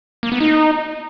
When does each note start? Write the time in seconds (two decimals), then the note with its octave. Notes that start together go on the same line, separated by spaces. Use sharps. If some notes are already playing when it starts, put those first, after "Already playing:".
0.23 A#3
0.32 B3
0.40 D#4